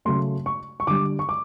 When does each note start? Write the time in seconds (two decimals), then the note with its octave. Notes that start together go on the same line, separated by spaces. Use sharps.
0.05 C#3 F#3 A3 C6
0.46 C#6
0.80 C#6
0.87 D3 G3 D6
1.19 C#6
1.29 D6